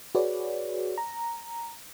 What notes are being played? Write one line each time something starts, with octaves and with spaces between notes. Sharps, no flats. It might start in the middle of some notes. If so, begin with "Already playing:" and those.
F#4 G#4 B4 C#5 D5
A#5